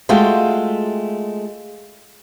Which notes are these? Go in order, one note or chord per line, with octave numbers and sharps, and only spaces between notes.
G#3 A3 F4 F#4 G5